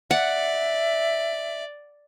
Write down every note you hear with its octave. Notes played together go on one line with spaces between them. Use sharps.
D5 E5 F#5